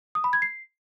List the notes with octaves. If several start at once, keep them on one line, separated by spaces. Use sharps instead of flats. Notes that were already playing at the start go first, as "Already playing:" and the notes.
D#6
B5
G#6
C7